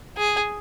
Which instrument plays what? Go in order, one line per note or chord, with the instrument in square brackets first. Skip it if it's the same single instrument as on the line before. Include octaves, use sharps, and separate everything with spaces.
[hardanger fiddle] G#4